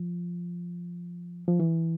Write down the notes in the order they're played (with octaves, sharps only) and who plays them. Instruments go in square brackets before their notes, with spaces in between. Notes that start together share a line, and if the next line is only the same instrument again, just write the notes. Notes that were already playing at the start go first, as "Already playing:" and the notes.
Already playing: [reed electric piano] F3
F3
E3